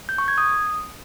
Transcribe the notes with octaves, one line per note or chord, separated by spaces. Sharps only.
G6
C#6
G#6
D#6